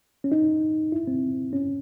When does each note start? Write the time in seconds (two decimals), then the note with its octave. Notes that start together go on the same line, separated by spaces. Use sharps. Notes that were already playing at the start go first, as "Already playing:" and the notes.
0.24 C#4
0.32 D#4
0.92 E4
1.07 C4
1.53 C#4